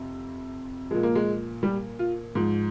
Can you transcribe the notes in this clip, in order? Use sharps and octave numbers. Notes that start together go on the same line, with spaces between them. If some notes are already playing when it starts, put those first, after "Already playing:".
Already playing: F2 C3
A#2 F3 G#3
A#3
G#3
G3
F4
G#2 F3